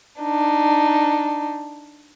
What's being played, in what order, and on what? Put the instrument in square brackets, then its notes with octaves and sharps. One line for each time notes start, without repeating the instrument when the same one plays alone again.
[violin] D4 D#4